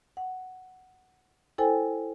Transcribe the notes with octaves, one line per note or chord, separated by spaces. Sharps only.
F#5
E4 A4 C5 G5 G#5